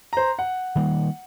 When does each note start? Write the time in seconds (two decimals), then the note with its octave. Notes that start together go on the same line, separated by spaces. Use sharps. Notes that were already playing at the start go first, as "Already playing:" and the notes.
0.13 C5 A#5
0.39 F#5
0.76 D#3 G3 A#3